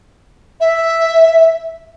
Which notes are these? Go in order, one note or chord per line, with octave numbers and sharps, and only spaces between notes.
E5